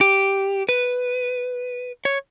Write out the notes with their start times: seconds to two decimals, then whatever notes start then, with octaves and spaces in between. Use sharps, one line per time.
0.01 G4
0.69 B4
2.05 C#5